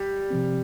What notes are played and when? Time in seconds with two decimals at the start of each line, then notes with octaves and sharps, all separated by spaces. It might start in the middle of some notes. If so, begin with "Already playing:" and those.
Already playing: G3
0.30 C3 F3 C4